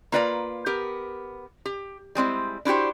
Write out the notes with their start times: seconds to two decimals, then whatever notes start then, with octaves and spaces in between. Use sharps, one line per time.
0.12 A#3 F4 B4 D5 E5 A#5
0.66 B3 G4 A#4
1.65 G4
2.15 G3 G#3 C4 E4
2.65 D4 E4 F#4 G4 C5